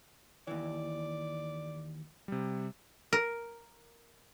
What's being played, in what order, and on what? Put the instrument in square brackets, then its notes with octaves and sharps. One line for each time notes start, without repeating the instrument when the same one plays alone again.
[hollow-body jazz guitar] D#2 E3 [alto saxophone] D5
[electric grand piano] C3 G3
[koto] A#4